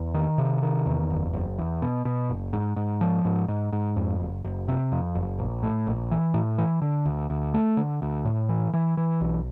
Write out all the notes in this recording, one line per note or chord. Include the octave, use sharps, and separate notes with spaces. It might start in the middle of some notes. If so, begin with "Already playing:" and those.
Already playing: E2
D#3
C3
D#3
E2
F#1
F#1
E2
B2
B2
F#1
G#2
G#2
F3
G#2
G#2
G#2
F2
F#1
F#1
C3
F2
F#1
A#1
A2
A#1
E3
A2
E3
D3
D2
D2
A3
D3
D2
A2
E3
E3
E3
B1